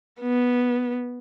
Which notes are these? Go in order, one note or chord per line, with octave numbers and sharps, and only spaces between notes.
B3